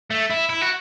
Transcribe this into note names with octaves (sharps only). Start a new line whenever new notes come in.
A3
E4
E4
F#4